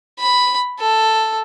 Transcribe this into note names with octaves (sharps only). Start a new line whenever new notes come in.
B5
A4